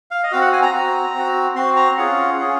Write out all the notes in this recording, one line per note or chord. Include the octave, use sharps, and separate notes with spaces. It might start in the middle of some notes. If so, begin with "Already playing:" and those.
F5
D#5
C4 F#4 F5
F#5
G#5
A#5
C4 F#4
C4 F#4
C4 F#4 C6
A#5
C#4 F4 G#4 F#5
C#4 F4 G#4